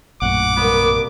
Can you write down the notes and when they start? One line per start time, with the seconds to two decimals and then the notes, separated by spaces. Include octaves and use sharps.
0.22 A#1 F#2 A2 C#4 F#5 D6
0.56 C2 A#3 B3